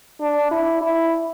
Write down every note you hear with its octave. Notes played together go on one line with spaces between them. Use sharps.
D4
E4
E4